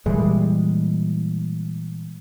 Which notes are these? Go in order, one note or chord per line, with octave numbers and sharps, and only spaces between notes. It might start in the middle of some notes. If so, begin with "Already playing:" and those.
A#2 E3 G3 G#3